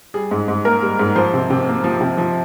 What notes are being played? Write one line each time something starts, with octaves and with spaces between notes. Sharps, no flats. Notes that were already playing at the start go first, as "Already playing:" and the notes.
G3 G#4
G#2
G#2
A#3 A#4
G3
G#2
F3 C5
C3
C3
A#3
F3
C3
F3